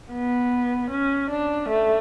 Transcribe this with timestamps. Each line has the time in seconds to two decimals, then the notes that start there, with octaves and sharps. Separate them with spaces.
0.13 B3
0.91 C#4
1.31 D4
1.70 A3